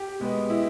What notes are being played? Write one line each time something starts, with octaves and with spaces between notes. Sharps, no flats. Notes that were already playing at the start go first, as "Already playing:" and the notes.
Already playing: G4
B2 G#3 B3
E4